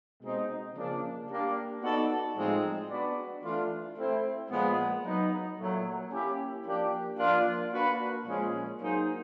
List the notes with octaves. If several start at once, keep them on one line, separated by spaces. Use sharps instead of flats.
B2 G#3 C4 D#4
C#3 F3 A#3 D4
G3 A#3 D4
B3 D#4 F#4 A4 D5
A2 F3 G#3 C4 D#4
B3 D4 F#4 B4 D5
E3 A3 D4 F4
A3 C4 E4
A#2 F3 G#3 B3
F#3 B3 D#4
A#2 F#3 A3
A#3 C#4 E4 G4
F3 A#3 D4 G4
F3 A#3 D4 F4
A#3 D4 F#4 B4
A#2 F3 G#3 C#4 F4
F#3 A#3 D#4 G#4 C5